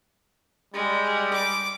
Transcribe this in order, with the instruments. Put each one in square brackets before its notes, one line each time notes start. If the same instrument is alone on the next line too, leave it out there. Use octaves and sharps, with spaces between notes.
[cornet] G3 [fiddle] G#3
[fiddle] D6